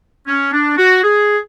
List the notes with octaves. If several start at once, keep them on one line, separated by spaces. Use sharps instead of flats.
C#4
D4
F#4
G#4